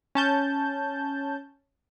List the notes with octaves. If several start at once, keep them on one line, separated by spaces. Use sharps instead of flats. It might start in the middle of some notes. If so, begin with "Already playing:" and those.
C#4 A5 G6